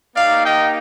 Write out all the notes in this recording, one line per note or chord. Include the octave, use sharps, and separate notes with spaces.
A#3 D#4 G4 D5 F5
D#5 G5